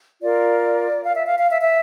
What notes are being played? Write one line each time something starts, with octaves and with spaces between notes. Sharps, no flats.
F4 A#4 D5
F5
E5
F5
F5
E5
E5